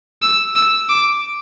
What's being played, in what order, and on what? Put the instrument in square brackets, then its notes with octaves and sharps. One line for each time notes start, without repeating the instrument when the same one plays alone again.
[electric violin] E6
E6
D6